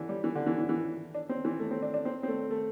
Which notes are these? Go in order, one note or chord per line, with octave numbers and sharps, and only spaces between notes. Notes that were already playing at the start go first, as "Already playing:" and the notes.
Already playing: D3 E3
G3
E3
D3
E3
E3
E3
D4
C4
E3
A3
C4
D4
D4
C4
C4
A3
A3